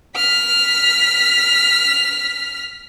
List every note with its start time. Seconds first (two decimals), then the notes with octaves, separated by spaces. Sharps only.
0.16 F6 B6